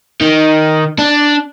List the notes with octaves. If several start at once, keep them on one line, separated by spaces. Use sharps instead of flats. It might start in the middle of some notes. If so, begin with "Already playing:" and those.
D#3
D4